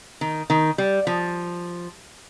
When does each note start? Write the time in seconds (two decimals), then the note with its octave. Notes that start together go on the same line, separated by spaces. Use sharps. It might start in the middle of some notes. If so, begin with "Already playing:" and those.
0.21 D#3
0.50 D#3
0.78 G3
1.07 F3